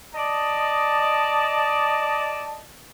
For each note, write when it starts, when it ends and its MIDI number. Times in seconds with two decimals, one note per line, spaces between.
0.15 2.64 74
0.15 2.64 75
0.15 2.64 81